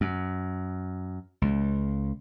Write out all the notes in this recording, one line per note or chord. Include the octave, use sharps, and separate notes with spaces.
F#2
C#2